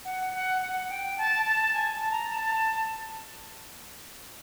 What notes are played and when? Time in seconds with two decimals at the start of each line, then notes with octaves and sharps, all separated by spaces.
0.05 F#5
0.33 F#5
0.62 F#5
0.89 G5
1.18 A5
1.46 A5
1.74 G#5
1.92 A5
2.11 A#5
2.30 A5